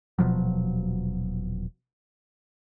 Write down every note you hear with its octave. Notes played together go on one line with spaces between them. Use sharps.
D#1 B2 F3 F#3